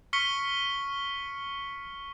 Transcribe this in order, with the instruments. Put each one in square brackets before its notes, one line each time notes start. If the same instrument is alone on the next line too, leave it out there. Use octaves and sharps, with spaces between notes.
[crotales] C#6 F6 B6 C#7 D#7 G7